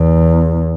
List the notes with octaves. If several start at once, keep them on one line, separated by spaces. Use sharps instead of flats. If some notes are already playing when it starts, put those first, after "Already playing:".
Already playing: E2